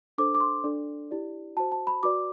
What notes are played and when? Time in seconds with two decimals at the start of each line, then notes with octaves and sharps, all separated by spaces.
0.18 D4 A4 C5 D6
0.35 D6
0.40 C6
0.64 D4 A4 D5
1.11 E4 G4 D5
1.57 F#4 C5 A5
1.72 A5
1.87 B5
2.03 F#4 B4 D5 D6